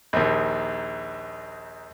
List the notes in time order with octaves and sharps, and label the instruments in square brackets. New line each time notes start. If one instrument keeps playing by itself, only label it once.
[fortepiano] A#1 D#2